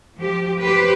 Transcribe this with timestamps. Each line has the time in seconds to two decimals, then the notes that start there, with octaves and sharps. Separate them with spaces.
0.17 F3 G4
0.62 G4 B4 C5